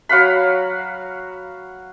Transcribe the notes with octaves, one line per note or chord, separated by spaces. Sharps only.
F#3 F5 F#5 B5